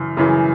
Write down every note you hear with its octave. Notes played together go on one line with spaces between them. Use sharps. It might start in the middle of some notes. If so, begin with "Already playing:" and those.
Already playing: F#2 C#3 E3
F#2 C#3 E3